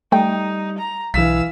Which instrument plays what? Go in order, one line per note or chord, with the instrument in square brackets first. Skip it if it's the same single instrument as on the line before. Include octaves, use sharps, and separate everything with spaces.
[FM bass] G3 [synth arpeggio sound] A3 G5 [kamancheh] D#4
[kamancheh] A#5
[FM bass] B1 [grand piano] E3 B6 [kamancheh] F5 E6